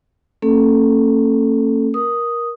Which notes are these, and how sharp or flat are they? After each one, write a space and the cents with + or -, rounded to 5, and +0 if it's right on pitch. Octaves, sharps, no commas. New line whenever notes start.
A3 +45 C#4 -35 A4 +0
A#4 +15 D#6 +0